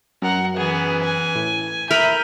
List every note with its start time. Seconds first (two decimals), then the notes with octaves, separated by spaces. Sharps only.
0.22 F#2 A#4 F#5
0.57 E3 B3 G#4
1.04 G#5
1.35 A2
1.91 A#4 E5 B5 G6 D#7